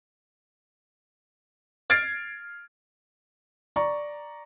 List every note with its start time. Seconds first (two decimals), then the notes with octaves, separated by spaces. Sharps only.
1.90 F6 G#6 A6 C7 D7
3.76 D5 A#5 C#6